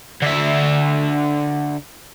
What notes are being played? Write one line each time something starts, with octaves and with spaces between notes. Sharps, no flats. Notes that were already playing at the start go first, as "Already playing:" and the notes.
D3 E5